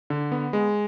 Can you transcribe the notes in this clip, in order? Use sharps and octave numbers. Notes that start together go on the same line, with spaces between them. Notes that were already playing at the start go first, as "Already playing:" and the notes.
D3
B3
G#3